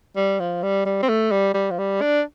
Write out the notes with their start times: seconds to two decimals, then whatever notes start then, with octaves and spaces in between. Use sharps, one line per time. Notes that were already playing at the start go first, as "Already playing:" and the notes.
0.16 G3
0.40 F3
0.63 G3
0.85 G3
1.03 C4
1.09 A3
1.31 G3
1.54 G3
1.71 F3
1.79 G3
2.01 D4